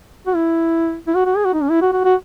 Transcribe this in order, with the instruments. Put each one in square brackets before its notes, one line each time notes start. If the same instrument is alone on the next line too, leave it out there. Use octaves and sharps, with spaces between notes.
[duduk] F#4
E4
E4
F#4
F#4
G#4
F#4
D#4
C#4
E4
F#4
F#4
F#4